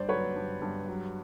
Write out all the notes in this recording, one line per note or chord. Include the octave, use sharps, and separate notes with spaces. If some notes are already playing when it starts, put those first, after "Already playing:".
Already playing: G2 C5 D5
F#3 B4 C#5
G2
G2
F#3